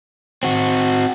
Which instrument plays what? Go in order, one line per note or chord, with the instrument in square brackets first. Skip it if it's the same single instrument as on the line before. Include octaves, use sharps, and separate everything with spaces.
[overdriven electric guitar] C4 F#4